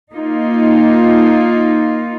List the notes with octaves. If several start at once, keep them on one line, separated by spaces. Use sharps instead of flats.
A#3 D#4 F4